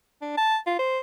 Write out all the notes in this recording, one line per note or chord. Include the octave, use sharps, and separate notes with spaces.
D4
A5
F4
C5